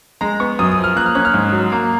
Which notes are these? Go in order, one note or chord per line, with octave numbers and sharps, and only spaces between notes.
G#3 A#5
B3 C#6
F#2 D#6
D#6
F3
F6
A#3 F#6
F6
C#4 F#6
F6
G#2
F#3
A#3